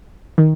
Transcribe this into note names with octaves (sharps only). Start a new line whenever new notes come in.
D#3